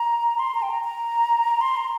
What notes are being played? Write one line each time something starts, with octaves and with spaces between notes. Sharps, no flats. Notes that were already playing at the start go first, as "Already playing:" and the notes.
Already playing: A#5
C6
A#5
G5
A#5
A#5
C6
A#5